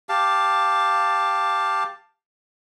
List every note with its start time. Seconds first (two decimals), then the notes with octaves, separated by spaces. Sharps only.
0.09 G4 F5 A5